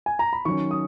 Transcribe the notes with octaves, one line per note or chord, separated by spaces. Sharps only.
G#5
A#5
B5
D#3 F#3 C#4 C#6
D#6